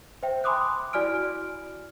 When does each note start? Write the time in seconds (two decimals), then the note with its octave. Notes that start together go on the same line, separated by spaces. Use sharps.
0.23 C5 E5 G5
0.44 G#5 B5 C6 D6 D#6 F#6
0.93 E4 F#4 D5 G#5 F6 D7